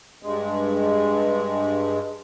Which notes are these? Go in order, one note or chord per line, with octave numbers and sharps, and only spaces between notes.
G2 G#3